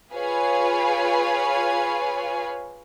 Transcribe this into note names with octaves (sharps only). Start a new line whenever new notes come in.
F4 G#4 B4 C#5 F5 G#5